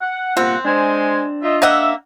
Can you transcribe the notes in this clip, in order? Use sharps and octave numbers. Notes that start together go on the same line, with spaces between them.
F#5
C2 A#2 C4 F4 F#5
G#3 D4 C5 G#5
F4 D#5 E5
A#3 D#5 E5 F#5